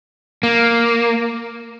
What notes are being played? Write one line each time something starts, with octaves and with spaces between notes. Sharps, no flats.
A#3